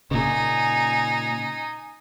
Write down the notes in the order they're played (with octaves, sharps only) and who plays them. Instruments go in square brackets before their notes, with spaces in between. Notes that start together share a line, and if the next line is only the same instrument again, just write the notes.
[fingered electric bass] A#2 C#3 [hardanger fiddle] D#4 G#5